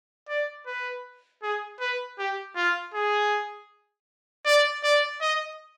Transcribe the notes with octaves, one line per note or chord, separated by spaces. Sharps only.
D5
B4
G#4
B4
G4
F4
G#4
D5
D5
D#5